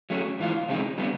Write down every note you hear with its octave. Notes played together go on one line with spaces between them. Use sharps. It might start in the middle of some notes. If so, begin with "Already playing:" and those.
F#3 A3 C#4
G#2 E3 F4
C3 F3 G#3 C4 D#4
D3 G3 B3